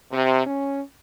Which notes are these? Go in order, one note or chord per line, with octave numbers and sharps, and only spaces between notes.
C3
C#4